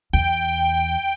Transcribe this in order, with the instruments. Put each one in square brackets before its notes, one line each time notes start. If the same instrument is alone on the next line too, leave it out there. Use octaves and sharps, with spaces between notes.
[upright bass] E2 [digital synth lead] G5